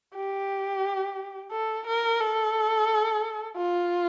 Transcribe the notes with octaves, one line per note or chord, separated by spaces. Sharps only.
G4
A4
A#4
A4
F4